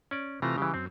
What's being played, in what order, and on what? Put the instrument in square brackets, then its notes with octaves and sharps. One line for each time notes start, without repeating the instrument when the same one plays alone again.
[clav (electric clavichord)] C#4 D5
[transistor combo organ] C3 F4 A#5 [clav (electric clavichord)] E3 A3
[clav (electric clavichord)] C#3 E3 [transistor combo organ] G3
[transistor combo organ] F#2 [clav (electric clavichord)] C4